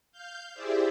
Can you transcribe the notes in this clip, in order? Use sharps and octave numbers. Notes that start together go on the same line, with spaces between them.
F5 G6
E4 G4 G#4 C5 D5 E5